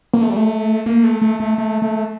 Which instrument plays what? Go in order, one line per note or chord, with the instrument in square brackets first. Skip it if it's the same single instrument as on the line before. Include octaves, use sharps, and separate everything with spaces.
[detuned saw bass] A#3
A3
G3
A3
A#3
A3
A3
A3
A3
A3